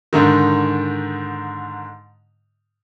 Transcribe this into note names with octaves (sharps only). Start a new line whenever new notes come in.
G#2 D3 D#3